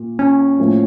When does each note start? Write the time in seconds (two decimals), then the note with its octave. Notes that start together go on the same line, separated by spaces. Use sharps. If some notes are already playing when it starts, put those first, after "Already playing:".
Already playing: A#2
0.19 C#4
0.58 A2 F3 A#3